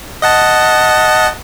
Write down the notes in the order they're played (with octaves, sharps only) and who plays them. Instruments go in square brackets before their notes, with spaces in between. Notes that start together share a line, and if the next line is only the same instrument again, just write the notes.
[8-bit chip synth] D#5 F#5 A5